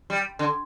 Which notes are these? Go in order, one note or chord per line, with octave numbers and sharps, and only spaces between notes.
G3
D3